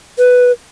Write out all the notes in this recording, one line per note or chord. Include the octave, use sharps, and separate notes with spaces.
B4